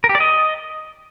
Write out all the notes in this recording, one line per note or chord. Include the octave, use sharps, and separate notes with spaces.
A#4
G4
D5
D#5